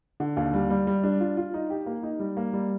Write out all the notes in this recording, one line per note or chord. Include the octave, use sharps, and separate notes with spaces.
D3
D#2
G3
G3
G3
D4
F4
F4
D#4
G4
A#3
D#4
G3
A#3
G3